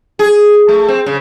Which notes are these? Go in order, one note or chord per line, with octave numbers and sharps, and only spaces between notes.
G#4
A3
C4
C#3